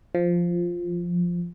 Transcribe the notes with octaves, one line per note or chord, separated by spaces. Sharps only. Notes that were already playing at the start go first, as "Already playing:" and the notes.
F3